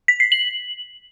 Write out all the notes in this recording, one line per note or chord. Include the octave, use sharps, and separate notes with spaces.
B6
C7
F#7